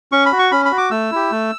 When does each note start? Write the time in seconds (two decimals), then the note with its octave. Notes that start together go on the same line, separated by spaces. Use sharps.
0.12 C#4 C#6
0.26 B5
0.32 F#4
0.39 C#6
0.52 C#4 B5
0.65 B5
0.72 F#4
0.78 D6
0.91 A3 E6
1.12 E4 G4
1.31 A3